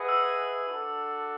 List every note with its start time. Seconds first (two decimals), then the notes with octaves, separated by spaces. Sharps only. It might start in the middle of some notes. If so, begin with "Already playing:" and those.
Already playing: E4 G#4 B4 D#5 F#5
0.09 E6
0.69 D4 F#4 A4